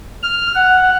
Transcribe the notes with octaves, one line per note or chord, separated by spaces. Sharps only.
F6
F#5